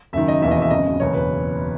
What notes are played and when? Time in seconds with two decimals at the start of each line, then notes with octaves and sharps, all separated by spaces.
0.13 F#1 F#2 D#3 E5
0.28 D#5
0.42 E1 D#2 C#3 E3 E5
0.51 D#5
0.62 E5
0.70 G#1 F#2 C#3 D#5
1.00 F#1 E2 B2 C#5
1.14 B4